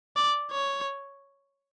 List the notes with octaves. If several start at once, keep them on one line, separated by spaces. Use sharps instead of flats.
D5
C#5